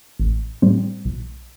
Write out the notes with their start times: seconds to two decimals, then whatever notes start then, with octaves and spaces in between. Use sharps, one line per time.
0.19 A1
0.62 A2 G3 C4
1.05 B1